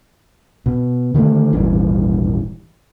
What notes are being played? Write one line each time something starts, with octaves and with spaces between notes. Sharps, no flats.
B2
D3 D#3 G3 A3
D#1 G#1 G2 E3